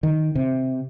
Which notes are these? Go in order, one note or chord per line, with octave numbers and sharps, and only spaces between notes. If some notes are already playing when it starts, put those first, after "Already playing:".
D#3
C3